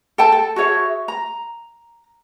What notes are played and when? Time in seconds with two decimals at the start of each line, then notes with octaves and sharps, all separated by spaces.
0.18 A4 G5 A5
0.32 A4
0.56 F#4 G#4 C#5 E5
1.08 A#5